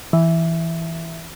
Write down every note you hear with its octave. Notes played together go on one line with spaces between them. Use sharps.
E3